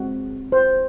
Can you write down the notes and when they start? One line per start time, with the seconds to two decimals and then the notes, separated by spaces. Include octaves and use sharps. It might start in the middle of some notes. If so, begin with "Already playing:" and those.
Already playing: G#3 C4 F#4
0.52 C5